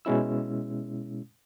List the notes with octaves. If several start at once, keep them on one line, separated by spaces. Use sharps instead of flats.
B2 G#3 C#4 E4 E6